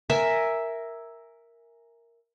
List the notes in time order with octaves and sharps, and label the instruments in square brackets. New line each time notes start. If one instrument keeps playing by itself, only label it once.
[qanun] A#4 E5 G#5